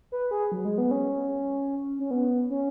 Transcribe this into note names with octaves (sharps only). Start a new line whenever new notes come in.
B4
G#4
F#3
G#3
B3
C#4
C#4
B3
C#4